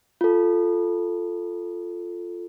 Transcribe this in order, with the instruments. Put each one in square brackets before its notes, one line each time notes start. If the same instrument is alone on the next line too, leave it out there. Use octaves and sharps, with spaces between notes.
[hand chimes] F4 A4